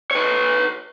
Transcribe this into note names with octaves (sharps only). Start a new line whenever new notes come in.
B4 C#5